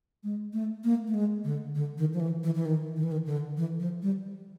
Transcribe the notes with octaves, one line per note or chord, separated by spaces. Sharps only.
G#3
A3
A#3
A3
G#3
D3
D3
D#3
F3
E3
E3
E3
D#3
D#3
E3
D#3
D3
E3
F3
G3